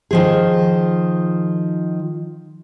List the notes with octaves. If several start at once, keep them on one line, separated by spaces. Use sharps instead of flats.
D#3 F3 G#4